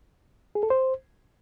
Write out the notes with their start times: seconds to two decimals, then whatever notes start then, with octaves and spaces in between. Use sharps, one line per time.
0.55 G#4
0.63 A4
0.70 C5